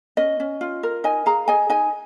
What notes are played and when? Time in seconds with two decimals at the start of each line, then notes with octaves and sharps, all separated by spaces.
0.17 C#4 D#5
0.40 C#4
0.61 F4
0.83 A#4
1.04 D#4 D#5 G#5
1.26 G#4 F5 A#5
1.48 G#4 D#5 G#5
1.70 D#4 D#5 G#5